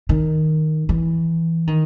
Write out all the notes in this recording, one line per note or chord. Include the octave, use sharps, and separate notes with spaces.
D#3
E3
D#3